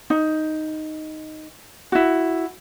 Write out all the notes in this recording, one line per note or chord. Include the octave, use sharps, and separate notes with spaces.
D#4
E4 F#4